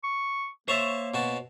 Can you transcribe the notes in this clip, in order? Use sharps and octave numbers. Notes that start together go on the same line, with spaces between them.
C#6
A#3 C5 C#5 E5 A5 C#6
B2 F#4 A5